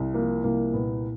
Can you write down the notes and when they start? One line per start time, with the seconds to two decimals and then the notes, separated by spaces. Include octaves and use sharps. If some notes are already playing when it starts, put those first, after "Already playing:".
Already playing: C2
0.14 F3 A#3
0.44 C2 A#3
0.73 A#2 B3